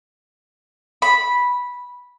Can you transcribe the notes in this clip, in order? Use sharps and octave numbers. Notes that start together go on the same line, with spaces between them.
B5